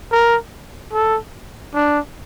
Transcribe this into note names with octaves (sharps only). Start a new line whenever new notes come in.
A#4
A4
D4